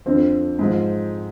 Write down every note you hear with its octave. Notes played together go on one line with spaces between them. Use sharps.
F2 D3 F3 C4
G#2 F3